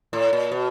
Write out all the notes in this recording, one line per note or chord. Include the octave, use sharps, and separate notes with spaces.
A2
A#2
B2